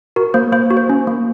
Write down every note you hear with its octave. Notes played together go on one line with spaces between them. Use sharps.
F#4 A#4
A#3 C5
A#3 C5
F#4
C5
C#4
A#3